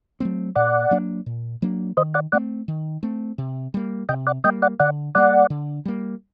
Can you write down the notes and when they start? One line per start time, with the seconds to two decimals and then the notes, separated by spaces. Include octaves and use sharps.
0.20 F#3 A3 C4
0.56 A#2 D5 F#5
0.91 F#3 A#3 D4
1.26 A#2
1.62 F#3 A#3 D4
1.97 D#3 C5 D#5
2.14 D5 F#5
2.32 A3 C4 D5 F#5
2.68 D#3
3.03 A3 C4
3.38 C3
3.74 G3 A#3
4.09 C3 D#5 G5
4.27 D5 F#5
4.44 G3 A#3 D#5 G5
4.62 D5 F#5
4.80 D3 D5 F#5
5.15 G3 A#3 D5 F#5
5.50 D3
5.85 G3 A#3